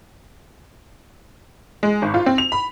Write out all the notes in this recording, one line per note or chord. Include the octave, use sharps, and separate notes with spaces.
G#3
G#1
F4
C4
F7
B5